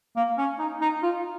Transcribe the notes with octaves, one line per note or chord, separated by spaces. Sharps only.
A#3
C#4
D#4
D#4
F4